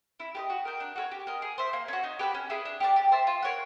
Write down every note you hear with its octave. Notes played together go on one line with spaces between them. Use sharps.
E4
G4 B4 D#5
F#4
A#4 D#5 G5
D4
F#4 A4 C#5
G4
A#4 D#5
G#4
C5 E5
A#3
C#4 F#4
D#4
G4 B4 E5
C#4
E4 G#4 B4
D4
G4 B4 D5
G4
C5 E5 A5
F4
A#4 C#5 F#5